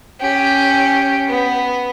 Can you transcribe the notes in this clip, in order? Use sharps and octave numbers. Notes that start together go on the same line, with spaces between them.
C#4 G4
B3